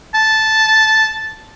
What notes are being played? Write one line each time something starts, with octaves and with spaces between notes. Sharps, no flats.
A5